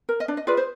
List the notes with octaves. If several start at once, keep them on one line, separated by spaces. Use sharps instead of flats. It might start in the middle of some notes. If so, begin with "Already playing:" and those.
A#4
D#5
D4 D5
D#5
F4 G#4 B4 D5
C5